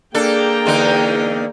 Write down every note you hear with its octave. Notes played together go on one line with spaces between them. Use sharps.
A#3 D4 G#4 A4 G5 A#5
E2 D3 D#4